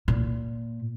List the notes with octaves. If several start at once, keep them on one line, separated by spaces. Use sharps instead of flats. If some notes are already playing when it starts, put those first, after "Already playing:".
A#2